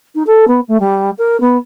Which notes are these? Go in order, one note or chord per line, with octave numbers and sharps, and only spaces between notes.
D#4
A4
B3
A3
G3
A#4
B3